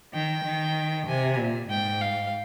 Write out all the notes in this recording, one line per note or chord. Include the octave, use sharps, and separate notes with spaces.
D#3 G5
D#3
C3 G#5
A#2
G#2 G5
F5